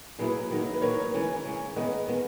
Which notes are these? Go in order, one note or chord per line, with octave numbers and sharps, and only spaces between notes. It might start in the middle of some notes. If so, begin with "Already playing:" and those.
B2 F#3 A#3 E4 G#4 B4
D#3 F#3 A#3 D#4
B4
D#3 F#3 A#3 D#4 A#4 C#5
C#3 E3 G#3
C#3 E3 G#3
D#3 G#3 B3 B4 D#5
D#3 G#3 B3